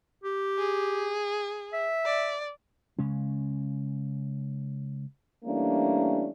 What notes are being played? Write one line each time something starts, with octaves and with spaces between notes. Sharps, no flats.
G4
G#4
E5
D5
C#3 G#3 C#4
E3 G3 A3 A#3 C#4 D4